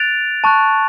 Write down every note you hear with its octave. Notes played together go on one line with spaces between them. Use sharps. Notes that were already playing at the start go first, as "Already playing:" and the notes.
Already playing: F#6 A6 D7 F7
A5 C#6 F#6